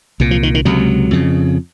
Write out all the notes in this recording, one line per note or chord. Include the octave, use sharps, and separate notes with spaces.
C2 A#2
F3
D#3
D#3
C#2 C3 F#3
F2 C#3